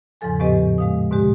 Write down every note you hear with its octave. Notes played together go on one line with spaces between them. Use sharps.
E2 G#2 C#3 F3 A4 G#5
A2 F3 B3 G4 B4 D#5
G#3 F5 D#6
G#2 B2 D3 G#3 G4